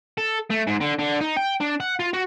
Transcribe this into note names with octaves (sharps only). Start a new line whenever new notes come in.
A4
A3
G#2
D3
D3
D#4
G5
D4
F#5
F4
F#4